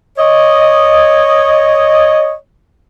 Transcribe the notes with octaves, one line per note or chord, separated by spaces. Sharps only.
C#5 D#5